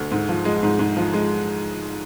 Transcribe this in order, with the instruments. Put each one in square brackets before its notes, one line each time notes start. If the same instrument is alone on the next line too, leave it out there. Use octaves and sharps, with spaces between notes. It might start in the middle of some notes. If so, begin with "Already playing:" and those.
Already playing: [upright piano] D2
G#2
F3
G#3
G#2
G#2
F3
G#3